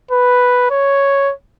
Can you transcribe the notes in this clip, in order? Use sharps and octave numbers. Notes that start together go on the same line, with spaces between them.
B4
C#5